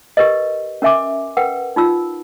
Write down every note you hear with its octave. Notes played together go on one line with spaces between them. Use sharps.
G4 A#4 B4 D#5
C#4 A#4 E5 G#5 D6
A#4 B4 F#5 G5
D#4 F4 E6